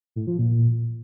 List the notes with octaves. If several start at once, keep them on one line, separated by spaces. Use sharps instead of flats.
A2
F3
A#2